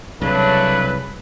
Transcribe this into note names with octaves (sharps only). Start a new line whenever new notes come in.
C2 C#3 F#3 A3 D4 B4